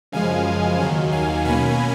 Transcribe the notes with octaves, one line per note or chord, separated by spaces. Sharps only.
F#2 C#3 F3 G#3 F5 G#5
D#2 D#3 F#3
F5 G#5
B2 A#3 C#4 G#5 B5